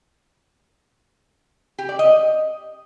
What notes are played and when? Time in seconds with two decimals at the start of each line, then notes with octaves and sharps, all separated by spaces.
1.79 G4
1.89 D5
1.99 D#5